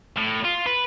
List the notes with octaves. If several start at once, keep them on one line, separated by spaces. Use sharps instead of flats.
A2
F4
B4